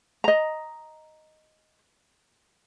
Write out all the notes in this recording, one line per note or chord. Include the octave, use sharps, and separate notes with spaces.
D#5 A#5